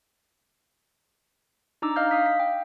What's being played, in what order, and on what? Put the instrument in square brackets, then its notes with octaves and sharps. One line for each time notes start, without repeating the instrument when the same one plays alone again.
[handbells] D4 D#4 A#5 D6 E6
D#5 F5 F6 G6
F5 D#6 B6
B6
G5